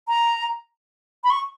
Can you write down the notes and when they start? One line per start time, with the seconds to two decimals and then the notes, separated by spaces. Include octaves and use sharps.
0.08 A#5
1.24 B5
1.30 C#6